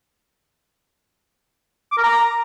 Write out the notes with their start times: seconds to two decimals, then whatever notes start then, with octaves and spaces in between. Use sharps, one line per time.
1.92 D6
1.97 A#4
2.03 A#5